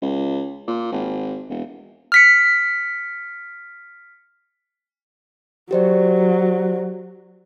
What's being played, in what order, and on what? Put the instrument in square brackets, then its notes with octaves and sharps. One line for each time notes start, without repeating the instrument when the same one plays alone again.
[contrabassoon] C#2
A#2
G#1
E1
[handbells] F6 B6 C#7
[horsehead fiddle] F#3 [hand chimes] G4 C5 D5